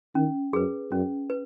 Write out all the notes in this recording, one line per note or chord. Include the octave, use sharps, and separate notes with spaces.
D#3 C#4
F#2 G#4 B4
F#2 C#4
B4